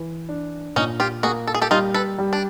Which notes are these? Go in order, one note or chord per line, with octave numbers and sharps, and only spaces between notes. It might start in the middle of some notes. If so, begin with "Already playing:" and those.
Already playing: E3
D4
A#2 C#4 D#4
F4 G4
A#3 F#4 G#4
A4
G#4
G4 A4
G3 D#4 F4
A4 B4
G3
D4